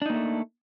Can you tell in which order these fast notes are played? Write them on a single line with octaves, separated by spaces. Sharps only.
D4 D#4 A#3 A3